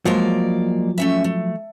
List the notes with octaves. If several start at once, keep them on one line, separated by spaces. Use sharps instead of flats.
F3 F#3 G#3 A#3 D5
A3 C#4 E5
A3